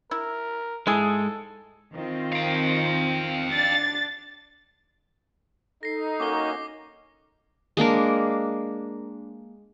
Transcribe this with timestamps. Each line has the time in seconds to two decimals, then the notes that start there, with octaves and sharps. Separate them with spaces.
0.11 E4 A#4
0.87 G#2 G#3 E4 G#4 A4
1.95 D#3 C4 F4
2.33 F5 G5
3.52 D4 A6
5.83 D#4 A4 A#6 C7
6.20 A#3 C#4 F#4 D6 C7 G7
7.77 G#3 A#3 D4 A#4